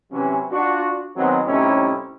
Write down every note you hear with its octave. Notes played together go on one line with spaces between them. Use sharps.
C3 E3 F#3 C#4
D4 F4 F#4
D#3 F#3 G#3 B3 C4
A2 C3 G3 C#4 D#4 E4